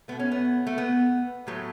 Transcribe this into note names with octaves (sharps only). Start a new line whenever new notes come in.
B2 A3 B3
C#4
B3
A3
B3
A2 F#3 A3 G4